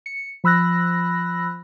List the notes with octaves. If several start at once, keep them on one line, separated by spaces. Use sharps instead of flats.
C#7
F3 B5 E6 F#6 A#6